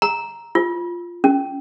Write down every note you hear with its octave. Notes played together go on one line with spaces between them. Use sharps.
A#5
F4
C#4